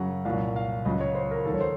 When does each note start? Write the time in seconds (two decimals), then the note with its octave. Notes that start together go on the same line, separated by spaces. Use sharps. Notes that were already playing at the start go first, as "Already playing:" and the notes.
Already playing: F#2 C#3 F#3 F#5
0.25 C2 A#2 F#3 F5
0.56 F5
0.85 C#2 C#3 F#3 D#5
1.00 C#5
1.15 C5
1.31 A#4
1.45 D#2 D#3 F#3 A4
1.54 C#5
1.61 C5